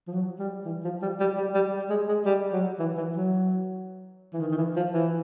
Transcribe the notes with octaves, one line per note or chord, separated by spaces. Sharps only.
F3
F#3
G3
E3
F3
G3
G3
G3
G3
G#3
G#3
G3
F#3
E3
E3
F#3
E3
D#3
D#3
E3
F3
E3